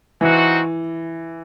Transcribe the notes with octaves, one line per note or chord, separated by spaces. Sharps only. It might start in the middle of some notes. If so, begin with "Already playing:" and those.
E3 C4 D#4 F#4